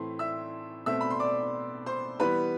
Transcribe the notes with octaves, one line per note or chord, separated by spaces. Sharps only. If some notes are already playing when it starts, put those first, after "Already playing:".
Already playing: A2 E3 A3 C4 C6
E5 E6
B2 A3 C4 E5 E6
B5
C6
D5 D6
C5 C6
E3 G3 B3 B4 B5